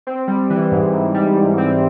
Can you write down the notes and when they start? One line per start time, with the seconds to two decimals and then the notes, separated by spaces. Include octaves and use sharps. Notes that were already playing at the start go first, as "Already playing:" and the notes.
0.07 C4
0.28 G3
0.50 E3
0.72 G#2
0.93 G#2
1.14 G3
1.36 G#2
1.58 C4